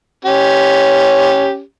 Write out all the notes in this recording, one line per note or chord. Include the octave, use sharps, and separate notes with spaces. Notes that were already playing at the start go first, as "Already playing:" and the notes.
C#4 G4